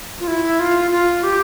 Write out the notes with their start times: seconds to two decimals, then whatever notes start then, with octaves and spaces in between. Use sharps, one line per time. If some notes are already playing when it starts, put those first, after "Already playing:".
0.20 F4
0.28 E4
0.60 F4
0.91 F4
1.23 G4